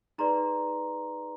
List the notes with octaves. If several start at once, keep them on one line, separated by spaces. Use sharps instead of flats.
D#4 G#4 B4 D5 A#5 C6